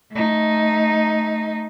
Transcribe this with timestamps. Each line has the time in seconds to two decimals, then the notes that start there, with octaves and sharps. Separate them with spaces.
0.13 A3 D#4